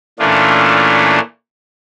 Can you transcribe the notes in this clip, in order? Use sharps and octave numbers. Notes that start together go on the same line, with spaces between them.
A#2 E3 A3 C#4 D4 F4